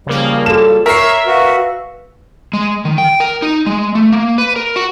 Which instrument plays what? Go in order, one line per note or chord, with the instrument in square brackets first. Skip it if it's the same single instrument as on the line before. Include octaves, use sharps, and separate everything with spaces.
[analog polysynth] C#3 A#3 [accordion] F3 G3
[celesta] F#4 A4 A5 [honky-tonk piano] E7
[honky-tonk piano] A#4 C7 [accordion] C#5 E6 [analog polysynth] E5 [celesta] B6 E7
[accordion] F#4 [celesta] B4 F5
[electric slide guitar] G#3
D#3
G5
A#4
D#4
G#3
A3
A#3
B4
A#4
F#4